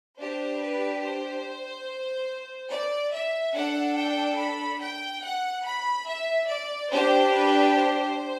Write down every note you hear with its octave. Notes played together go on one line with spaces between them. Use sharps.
D4 G4 C5
B4
C5
D5
E5
D4 A4 F#5
G5
B5
G5
F#5
B5
E5
D5
D4 G4 C5
B4
C5